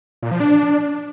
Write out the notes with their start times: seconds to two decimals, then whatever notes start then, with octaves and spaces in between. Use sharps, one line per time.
0.23 A#2
0.31 F3
0.40 D4